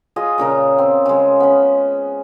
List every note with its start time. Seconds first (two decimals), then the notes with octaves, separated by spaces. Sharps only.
0.16 F4 G#4 D#5
0.38 A#2 C#3 A#4
0.78 C4
1.06 C#3 G#3
1.40 B3 C#4